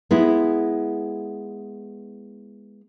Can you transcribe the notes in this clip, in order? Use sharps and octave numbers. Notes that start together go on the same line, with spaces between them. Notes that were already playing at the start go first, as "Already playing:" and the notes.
G#3 B3 E4